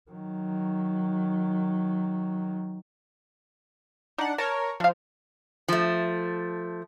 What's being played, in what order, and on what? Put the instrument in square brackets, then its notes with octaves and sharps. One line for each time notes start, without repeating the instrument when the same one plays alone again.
[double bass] D#3 F#3
[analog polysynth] D4 F#5 [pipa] D#4
[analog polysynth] A#4 C#5 [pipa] A5
[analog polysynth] F3 [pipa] D4 F5
[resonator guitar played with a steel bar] F3 A3